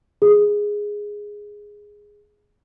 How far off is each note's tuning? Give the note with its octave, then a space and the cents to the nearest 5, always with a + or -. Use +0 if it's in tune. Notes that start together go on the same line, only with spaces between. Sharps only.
G#4 -5